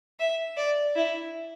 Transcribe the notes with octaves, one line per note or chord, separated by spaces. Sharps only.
E5
D5
E4